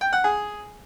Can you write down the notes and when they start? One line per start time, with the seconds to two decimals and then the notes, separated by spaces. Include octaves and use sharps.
0.01 G5
0.13 F#5
0.24 G#4